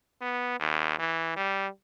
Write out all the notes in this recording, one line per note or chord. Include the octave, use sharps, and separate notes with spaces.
B3
D#2
E3
G3